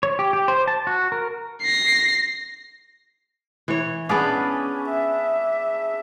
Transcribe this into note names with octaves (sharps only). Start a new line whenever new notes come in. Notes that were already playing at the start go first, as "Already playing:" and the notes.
C#5
G4
G4
C5
A5
F#4
A#4
A#6 C7
E3 C#5
B3 C#4 D4 G#4 D5 F5 B5
E5